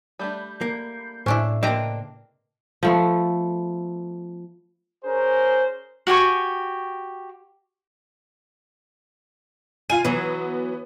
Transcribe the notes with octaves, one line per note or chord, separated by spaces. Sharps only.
G3 A3 D4 B5 G6
A#3
A2 C#3 C#4 D4 E4 C5
A#3 C4 D4 B4 D#5 A#5
F3 A3 B3
C#4 G#4 A#4 C5
F#4 G4 G#5 C#6
F4 G#5 D#7
E3 F#3 B3